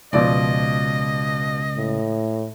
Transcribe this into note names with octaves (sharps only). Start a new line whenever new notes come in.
C#2 B2 F3 D5 D#5
A2